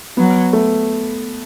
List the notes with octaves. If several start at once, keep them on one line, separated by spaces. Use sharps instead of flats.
F#3 B3
A3